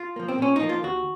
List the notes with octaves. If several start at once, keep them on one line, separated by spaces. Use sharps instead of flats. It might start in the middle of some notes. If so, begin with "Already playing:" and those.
Already playing: F4
F3 A#3
C4
A#2 C#4
D#4
F3 A#3
F4
D#2 F#4